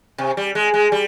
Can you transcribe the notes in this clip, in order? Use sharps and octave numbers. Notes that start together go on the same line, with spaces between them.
C3
G3
G#3
G#3
G3